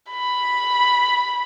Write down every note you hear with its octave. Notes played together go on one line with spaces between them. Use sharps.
B5